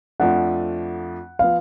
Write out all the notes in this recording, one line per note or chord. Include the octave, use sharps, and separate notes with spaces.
F2 F3 A3 D4 F#5
F3 B3 F5